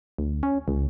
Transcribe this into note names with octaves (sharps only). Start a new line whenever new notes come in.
D2
C#4
C#2